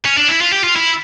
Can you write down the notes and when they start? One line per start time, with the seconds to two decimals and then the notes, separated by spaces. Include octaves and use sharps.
0.05 C#4
0.17 D4
0.28 E4
0.41 F4
0.53 G4
0.64 F4
0.76 E4